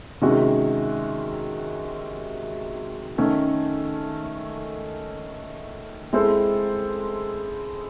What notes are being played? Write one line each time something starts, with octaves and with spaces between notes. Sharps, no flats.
C3 D#3 G#3 C#4 F#4
D#3 A3 C#4
G#3 C4 E4 A4 C5